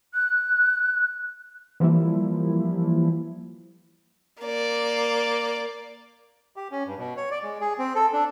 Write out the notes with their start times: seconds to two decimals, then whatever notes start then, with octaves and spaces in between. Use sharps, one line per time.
0.14 F#6
1.80 E3 F3 G3 A#3 E4
4.42 A#3 D5
6.56 G4
6.72 C#4
6.87 G2
6.98 B2
7.17 C#5
7.31 D5
7.43 G#3
7.61 G#4
7.79 C4
7.95 A4
8.13 D4